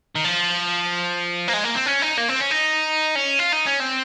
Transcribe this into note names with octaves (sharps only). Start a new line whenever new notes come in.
D#3
F3
A#3
G#3
A#3
C4
C#4
D#4
A#3
C4
C#4
D#4
C#4
F4
D#4
C#4
C4